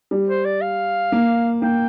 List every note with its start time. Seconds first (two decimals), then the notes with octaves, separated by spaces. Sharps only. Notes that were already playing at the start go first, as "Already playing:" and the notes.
0.11 G3
0.28 C5
0.45 D5
0.61 F5
1.12 A#3
1.62 A#3 G5